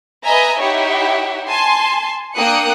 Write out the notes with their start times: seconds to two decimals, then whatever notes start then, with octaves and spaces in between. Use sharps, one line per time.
0.23 B4 D#5 E5 G#5 A#5
0.60 D#4 E4 G4 C#5 E5 F#5
1.50 G#5 A5 C6
2.35 A#3 D4 G5 D#6 F#6 C#7